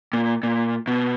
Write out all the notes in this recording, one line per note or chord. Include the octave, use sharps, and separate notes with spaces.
A#2
A#2
B2